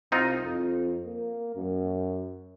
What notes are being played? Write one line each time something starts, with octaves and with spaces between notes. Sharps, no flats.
C2 C4 D#4 F4
F2
A#3
F#2